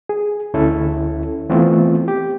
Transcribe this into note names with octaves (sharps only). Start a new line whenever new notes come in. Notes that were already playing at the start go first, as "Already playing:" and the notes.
G#4
D2 C#4 E4 A4
E3 A3 B3 C4 F4
G4